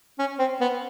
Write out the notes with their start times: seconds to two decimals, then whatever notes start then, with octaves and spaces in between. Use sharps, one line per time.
0.19 C#4
0.39 C4
0.61 B3